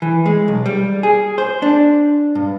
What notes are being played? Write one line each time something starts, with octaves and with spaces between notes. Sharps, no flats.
E3
G#3
B1
G3
G#4
C5
D4
G2